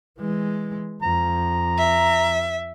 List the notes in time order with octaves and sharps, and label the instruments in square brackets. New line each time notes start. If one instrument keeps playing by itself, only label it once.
[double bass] E3 G#3
[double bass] F2 [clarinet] A#5
[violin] E5